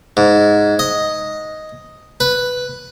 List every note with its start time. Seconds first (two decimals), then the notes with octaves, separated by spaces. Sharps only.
0.17 G#2
0.79 D#5
2.20 B4